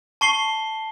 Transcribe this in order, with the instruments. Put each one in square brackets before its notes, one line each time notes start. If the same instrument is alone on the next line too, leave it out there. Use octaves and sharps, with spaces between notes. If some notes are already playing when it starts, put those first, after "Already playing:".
[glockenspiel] A5 C#6 C7 G7